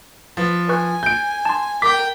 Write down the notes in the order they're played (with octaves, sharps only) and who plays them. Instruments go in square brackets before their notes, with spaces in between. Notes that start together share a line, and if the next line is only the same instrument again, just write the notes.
[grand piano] F3 [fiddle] B4
[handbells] B4 C#6 F#6 [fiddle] G#5
[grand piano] G6 D7
[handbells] A5 C6
[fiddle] A#4 G5 [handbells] D6 [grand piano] B6